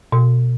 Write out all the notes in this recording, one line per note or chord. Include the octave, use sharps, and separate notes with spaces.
B2